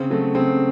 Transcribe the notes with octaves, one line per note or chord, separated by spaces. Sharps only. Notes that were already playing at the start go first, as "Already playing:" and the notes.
Already playing: C#3 C4
F#3 A3
C#3 C4